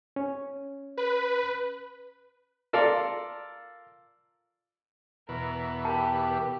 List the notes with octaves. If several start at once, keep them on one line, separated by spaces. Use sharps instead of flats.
C#4
B4
F4 A4 A#4 D5 F5
E2 B2 A#4
G4 A#4 A5